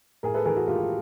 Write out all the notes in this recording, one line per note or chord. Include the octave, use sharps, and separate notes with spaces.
A2 G#4 A#4
A4 B4
E3 G#4 A#4
F#4 G#4
A2 F4 G4